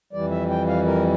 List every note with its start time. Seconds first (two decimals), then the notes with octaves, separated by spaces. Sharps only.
0.13 F2 E3 G3 D5
0.31 E5
0.50 G5
0.68 F5
0.86 A#4